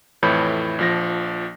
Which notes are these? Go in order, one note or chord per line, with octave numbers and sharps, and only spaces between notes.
F2 A2 E3 C#5 B5 G6
A#1 F3 A#6